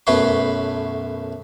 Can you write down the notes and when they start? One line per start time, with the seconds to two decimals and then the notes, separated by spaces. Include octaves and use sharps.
0.07 B1 F#2 A3 B4 C#5 C6